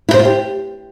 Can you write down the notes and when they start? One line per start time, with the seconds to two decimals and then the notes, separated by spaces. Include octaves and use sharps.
0.09 E4
0.14 C5
0.19 F4
0.25 G4